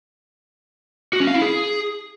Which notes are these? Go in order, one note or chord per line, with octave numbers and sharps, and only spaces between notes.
F#4
C#4
F5
E4
G#4